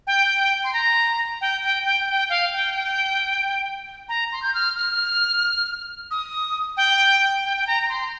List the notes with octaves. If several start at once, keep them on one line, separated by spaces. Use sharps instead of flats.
G5
C6
A#5
G5
G5
G5
G5
F5
G5
A#5
C6
G6
F6
F6
D#6
G5
G5
G5
A#5
A#5
C6